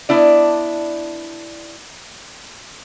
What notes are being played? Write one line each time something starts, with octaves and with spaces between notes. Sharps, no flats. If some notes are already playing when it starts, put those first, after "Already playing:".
B3 D4 E4 D5